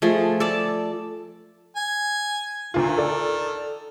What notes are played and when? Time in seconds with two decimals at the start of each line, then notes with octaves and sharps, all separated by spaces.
0.02 F3 A3 G#4
0.40 A4 D5 A5
1.76 G#5
2.74 D2 D#3 F4
2.98 A4 D5